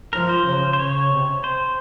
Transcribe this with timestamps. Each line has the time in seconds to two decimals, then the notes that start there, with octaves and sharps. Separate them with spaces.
0.13 F3 A#4
0.29 C5
0.46 C#3
0.73 C5
0.79 C#3 C#5
1.12 C3
1.44 C5